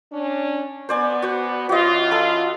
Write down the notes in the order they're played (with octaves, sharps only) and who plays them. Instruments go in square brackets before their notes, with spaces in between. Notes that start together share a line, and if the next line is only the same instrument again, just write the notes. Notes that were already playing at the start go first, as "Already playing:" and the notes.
[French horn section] C#4 D4
[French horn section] B3 [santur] C5 D5 G#5
[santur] F#4 C5
[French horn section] E3 C#4 F4 [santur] F#4 D#5
[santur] A4 B5